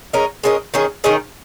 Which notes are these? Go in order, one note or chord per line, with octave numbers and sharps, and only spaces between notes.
G#3 C#4 A#4 D#5
G#3 C#4 A#4 D#5
D#3 C#4 G#4 D#5
D#3 C#4 G#4 D#5